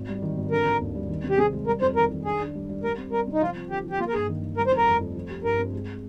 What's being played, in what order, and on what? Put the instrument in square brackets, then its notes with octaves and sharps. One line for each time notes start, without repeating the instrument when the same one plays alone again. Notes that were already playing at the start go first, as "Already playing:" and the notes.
Already playing: [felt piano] G#1
G3
D#3
G#1
[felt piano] D3 [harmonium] A#4
[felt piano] D3
D#2
G3
D#3
C3
[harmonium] G4
[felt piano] C3 [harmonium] G#4
[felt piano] G#3
[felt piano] G3 [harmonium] A#4
[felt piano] F2 [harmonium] C5
[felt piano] D#3 [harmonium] A#4
[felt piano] D#3
[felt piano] D4 [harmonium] G#4
[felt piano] D4
G3
G3
[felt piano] G3 [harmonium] A#4
[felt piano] C4
[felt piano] G3 [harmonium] A#4
[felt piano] C3
[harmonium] D#4
[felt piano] F3 [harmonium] F4
[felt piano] C4
[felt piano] D3 [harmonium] G4
[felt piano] F3
[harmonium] G4
[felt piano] A#3 [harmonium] F4
[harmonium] A#4
[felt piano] G2 [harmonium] G#4
[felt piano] D#3
D#3
[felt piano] G3 [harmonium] A#4
[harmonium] C5
[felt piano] F2 [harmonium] A#4
[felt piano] F1
F2
F3
G4
[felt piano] G2 [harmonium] A#4
[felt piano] C4
G#3